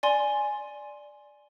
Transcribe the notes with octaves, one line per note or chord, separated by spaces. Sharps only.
D5 G#5 C6